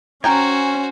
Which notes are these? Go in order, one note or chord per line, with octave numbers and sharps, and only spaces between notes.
C#4 F#4 A#4 C5 G5 G#5 A#5